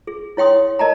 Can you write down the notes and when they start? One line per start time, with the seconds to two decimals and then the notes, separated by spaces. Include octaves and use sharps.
0.07 G#4
0.37 E4 C#5 G5 C6 D#6
0.79 A#4 D#5 A5 A#5